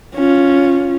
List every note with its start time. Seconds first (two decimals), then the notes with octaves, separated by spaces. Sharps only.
0.14 C#4 F4